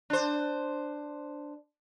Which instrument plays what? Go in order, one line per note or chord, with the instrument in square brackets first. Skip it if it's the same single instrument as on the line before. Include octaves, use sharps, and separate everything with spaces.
[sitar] D4 C5